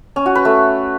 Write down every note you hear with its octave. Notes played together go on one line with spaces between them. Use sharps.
C#4
F#4
B4
A3